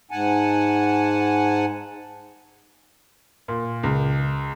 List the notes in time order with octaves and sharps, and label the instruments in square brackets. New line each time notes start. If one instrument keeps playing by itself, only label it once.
[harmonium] G#2 F#5 G#5 A5
[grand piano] A#2
C#2